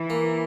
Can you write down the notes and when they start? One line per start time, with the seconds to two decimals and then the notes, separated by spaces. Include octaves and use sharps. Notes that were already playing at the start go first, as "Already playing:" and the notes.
Already playing: E3
0.10 A#3